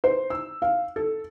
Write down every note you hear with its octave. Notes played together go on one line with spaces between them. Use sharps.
C5
E6
F5
A4